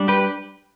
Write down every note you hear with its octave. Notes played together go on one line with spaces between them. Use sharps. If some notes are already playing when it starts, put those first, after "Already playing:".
Already playing: G3 D4
G4 B4